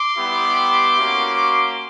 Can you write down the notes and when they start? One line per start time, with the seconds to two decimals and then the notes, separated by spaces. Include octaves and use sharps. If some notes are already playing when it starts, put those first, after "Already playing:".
Already playing: C6 D6
0.17 G3 B3 E4 G4
0.97 A#3 C#4 F#4